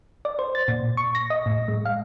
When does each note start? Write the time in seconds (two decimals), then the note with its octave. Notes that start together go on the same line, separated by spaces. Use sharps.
0.25 D5
0.39 C5
0.55 A6
0.68 A#2
0.97 C#6
1.15 A#6
1.30 D#5
1.46 A2
1.68 G#3
1.85 F5